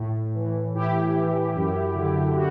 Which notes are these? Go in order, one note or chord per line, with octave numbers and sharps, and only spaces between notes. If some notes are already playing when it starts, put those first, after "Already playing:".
Already playing: A2
E3
A2 E4 G4
E3
F#2
D3
F#4